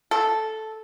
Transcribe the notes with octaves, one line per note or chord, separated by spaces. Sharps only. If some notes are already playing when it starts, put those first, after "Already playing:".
A4